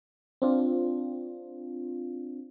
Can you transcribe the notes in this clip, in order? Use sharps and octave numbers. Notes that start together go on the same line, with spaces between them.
C4 D4 F4